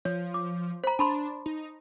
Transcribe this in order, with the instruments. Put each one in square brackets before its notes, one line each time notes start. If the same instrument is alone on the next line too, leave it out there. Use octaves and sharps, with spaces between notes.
[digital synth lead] F3 [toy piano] C#5
[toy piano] D6
[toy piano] C5 A#5 [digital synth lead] B5
[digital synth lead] D4 [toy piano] A5 B5 C6
[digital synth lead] D#4